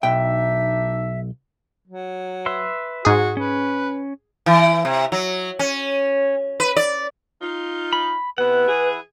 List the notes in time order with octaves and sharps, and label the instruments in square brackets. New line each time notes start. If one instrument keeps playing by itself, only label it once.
[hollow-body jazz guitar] B1 G5 [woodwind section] D4 D#4 E5
[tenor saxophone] F#3
[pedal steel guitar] B4 E5 C6
[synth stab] G#2 G#4 [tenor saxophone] F#4
[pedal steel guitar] C#4 [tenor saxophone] B4
[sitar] E3
C3
F#3
C#4
B4
D5
[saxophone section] D#4 F4
[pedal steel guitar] B5
[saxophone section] C3 B3 [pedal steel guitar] E4 F#5 [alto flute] B4
[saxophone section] E3 G#4